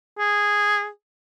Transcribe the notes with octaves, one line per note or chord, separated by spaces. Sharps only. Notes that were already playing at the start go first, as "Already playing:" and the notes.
G#4